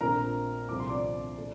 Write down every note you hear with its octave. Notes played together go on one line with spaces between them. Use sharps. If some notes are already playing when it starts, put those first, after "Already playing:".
A#1 A#2 A3 C4 A#4 A#5
C2 A#2 F3 A3 C4 D6
C6
D5 D6
A#2 A3